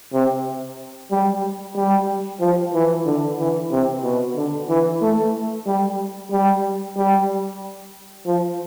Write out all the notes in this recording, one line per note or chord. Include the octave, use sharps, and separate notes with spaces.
C3
G3
G3
F3
E3
D3
E3
C3
B2
D3
E3
A3
G3
G3
G3
F3